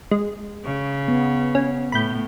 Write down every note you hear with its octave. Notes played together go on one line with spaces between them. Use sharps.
G#3
C#3
B3
C#4
A2 B5 G6